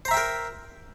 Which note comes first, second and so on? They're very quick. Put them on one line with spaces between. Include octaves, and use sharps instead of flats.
C5 A#5 E5 G5 A#4